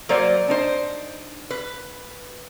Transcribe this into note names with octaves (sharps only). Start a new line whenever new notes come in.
F#3 A#3 C5 D5
D4 D#4 C5
B4